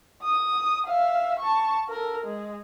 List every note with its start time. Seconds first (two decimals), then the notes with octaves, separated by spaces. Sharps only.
0.22 D#6
0.86 E5 F5
1.39 A5 C#6
1.89 A4 A#4
2.24 G#3